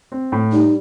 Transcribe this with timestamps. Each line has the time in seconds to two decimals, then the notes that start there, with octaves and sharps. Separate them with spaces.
0.12 C4
0.32 A2
0.53 G3 D#4